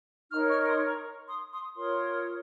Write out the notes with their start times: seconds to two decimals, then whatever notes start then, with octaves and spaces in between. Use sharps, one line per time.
0.31 D#4 A#4 C#5 C#6 F6
0.49 C#6 F6
0.67 C6 D#6
0.86 A#5 C#6
1.27 C6 D#6
1.51 C6 D#6
1.75 F4 A#4 C#5 C6 D#6